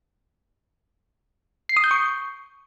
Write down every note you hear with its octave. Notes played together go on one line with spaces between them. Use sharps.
C7
D#6
G6
C#6